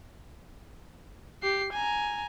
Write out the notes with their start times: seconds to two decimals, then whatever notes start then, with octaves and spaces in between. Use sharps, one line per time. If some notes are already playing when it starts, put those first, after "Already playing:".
1.43 G4 C7
1.73 G#5 A#5